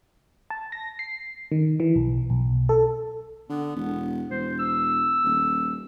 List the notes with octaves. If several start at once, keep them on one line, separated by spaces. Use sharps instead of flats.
A5
A#6
C7
D#3
E3
B1
B1
A4
D3 B3
E1
E1 C5
E6
D#1